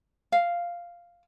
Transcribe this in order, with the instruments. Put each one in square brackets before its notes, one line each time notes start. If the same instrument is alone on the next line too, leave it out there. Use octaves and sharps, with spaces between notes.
[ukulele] F5